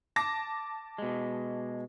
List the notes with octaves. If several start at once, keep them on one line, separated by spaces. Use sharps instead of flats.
A5 D6 A#6
B2 G#3